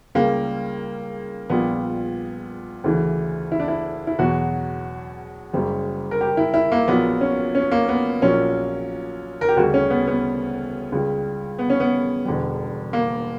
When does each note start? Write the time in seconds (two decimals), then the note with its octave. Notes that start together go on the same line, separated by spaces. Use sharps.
0.15 C#2 C#3 G3 A#3
1.50 A#1 A#2 G3 B3
2.84 D2 C#3 E3
3.52 E4
3.60 D4
3.68 E4
4.07 E4
4.19 E2 B2 F#3 F#4
5.53 F#1 F#2 C#3 G3
6.11 A#4
6.21 G4
6.37 E4
6.54 E4
6.72 A#3
6.88 A#1 A#2 F#3 B3
7.21 C#4
7.55 C#4
7.72 A#3
7.88 B3
8.22 A#1 A#2 F#3 C#4
9.41 A#4
9.49 G4
9.57 D2 C#3 G3 F#4
9.74 C#4
9.90 B3
10.07 B3
10.92 C#2 C#3 G3
11.59 B3
11.70 C#4
11.80 B3
12.25 E1 E2 D3 G3
12.93 A#3